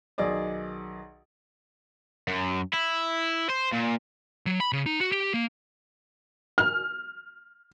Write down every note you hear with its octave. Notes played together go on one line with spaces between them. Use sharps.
B1 D#3 G#4 D5 D#5
F#2
E4
C5
A#2
F#3
B5
C#3
D#4
F#4
G4
A#3
F6